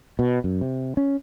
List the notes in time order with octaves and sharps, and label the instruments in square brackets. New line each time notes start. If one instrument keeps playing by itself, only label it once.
[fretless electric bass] B2
F#2
C3
C#4